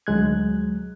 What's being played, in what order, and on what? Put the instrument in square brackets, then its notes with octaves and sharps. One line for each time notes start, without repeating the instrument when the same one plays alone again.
[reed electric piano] D2 F#3 G#3 F#6 G#6